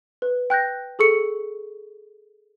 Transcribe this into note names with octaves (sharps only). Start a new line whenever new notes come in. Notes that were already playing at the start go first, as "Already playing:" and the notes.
B4
G5 F#6 G6 A#6
G#4 A4 C#6 C#7